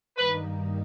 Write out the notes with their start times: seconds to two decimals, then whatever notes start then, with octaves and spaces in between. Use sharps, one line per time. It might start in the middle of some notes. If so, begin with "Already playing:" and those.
0.17 G2 D#3 G3 A#3 D#4 B4